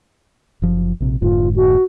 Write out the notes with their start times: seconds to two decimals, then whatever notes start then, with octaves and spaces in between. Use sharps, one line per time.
0.62 F#1 F3
1.00 A#1 C3
1.22 F1 G#2 D3 F4
1.56 F#4